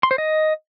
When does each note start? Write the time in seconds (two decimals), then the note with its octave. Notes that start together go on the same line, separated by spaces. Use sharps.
0.03 C6
0.11 C5
0.18 D#5